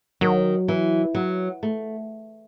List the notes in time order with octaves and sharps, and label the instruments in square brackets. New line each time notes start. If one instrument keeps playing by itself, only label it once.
[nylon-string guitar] D#3 [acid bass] F#3
[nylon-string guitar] E3
F#3
A3